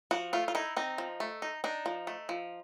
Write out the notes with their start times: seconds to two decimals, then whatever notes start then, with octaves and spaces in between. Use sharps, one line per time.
0.11 F3 F#4
0.33 A3 F4
0.48 F4
0.55 D#4 E4
0.77 C4 D#4
0.98 F3
1.20 A3
1.42 D#4
1.64 D4 D#4
1.86 F3
2.07 A3
2.29 F3